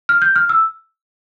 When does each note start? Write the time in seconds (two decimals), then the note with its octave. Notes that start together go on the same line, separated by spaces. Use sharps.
0.09 F6
0.22 G6
0.36 F6
0.49 E6